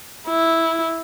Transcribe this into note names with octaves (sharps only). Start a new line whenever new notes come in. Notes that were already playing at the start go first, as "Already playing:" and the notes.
E4